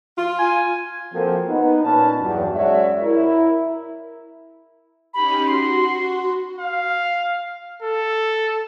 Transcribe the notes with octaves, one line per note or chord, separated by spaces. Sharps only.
F4
G#5
F3 A#3 C4 F#4 A4 A#4
B3 D#4
A#2 C#4 B4 A5
E2 G2 F#3
F#2 G#3 F#4 C#5 D5 E5
E4 A#4
C#4 D#4 G4 B5
F#4 C6
F5
A4